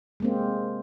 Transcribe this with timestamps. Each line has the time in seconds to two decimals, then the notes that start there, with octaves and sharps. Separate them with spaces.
0.20 G#3 A#3 C4